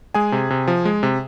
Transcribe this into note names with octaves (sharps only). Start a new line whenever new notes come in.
G#3 G#4 G#5
C3
C3
F3
G#3
C3